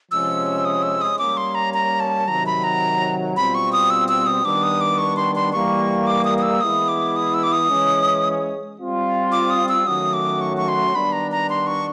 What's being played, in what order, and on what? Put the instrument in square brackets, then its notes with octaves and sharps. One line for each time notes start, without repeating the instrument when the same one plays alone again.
[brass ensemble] C3 F3 G#3 C#4 [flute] E6
[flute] D#6
E6
D#6
[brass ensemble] G3 A#3 C#4 [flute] D6
[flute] C6
A#5
A#5
A5
[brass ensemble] C3 D#3 F#3 [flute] A#5
[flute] B5
A#5
[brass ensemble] B2 G3 C4 F4 [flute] B5
[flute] C#6
D#6
E6
E6
D#6
[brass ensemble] D#3 G3 B3 D4 [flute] D6
[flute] D#6
D6
C#6
C6
C6
[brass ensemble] E3 G3 A#3 [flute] C#6
[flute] D6
D#6
D#6
E6
[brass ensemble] E3 G#3 B3 E4 [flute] D#6
[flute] D6
D#6
E6
D6
D#6
[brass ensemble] E3 G#3 C#4
G3 C4 F4
[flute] D6
D#6
E6
[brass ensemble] D#3 F#3 A3 C#4 F#4 [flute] D#6
[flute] D6
C#6
C#6
C6
[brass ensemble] D#3 G3 B3 D4 [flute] B5
[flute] A#5
A#5
C6
C#6